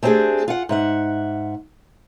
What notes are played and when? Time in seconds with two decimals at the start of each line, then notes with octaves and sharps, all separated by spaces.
0.03 A3 C4 D4 D#4 G4 G#4
0.48 F4 F#5
0.69 G#2 E5 F#5